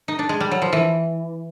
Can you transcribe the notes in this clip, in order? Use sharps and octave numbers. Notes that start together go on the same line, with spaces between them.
D#4
D4
G#3
G3
F#3
F3
E3